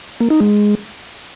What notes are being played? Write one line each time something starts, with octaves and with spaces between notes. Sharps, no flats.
A#3
D#4
G#3